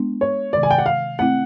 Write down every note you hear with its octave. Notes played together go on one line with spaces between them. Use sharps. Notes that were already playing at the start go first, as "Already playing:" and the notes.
Already playing: G#3 B3 D4
C#5
C3 D#3 G#3 D5
G#5
G5
F#5
F5
A3 C4 E4 F#5